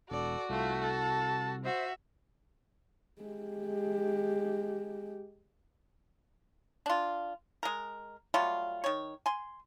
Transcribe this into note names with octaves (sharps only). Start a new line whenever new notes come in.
E1 F#4 A4 D5
C2 A3 F4
A4 A5
F#4 C5 E5
G#3 G4
D4 F4
G#3 A#4
F#3 G3 A3 F4
D#3 C#5
G#5 C6